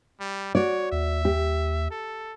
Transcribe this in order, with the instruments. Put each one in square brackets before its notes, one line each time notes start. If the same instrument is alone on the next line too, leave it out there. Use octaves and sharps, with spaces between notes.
[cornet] G3
[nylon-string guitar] F#4 D5 [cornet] C#5
[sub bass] D#2 [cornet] E5
[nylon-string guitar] G4
[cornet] A4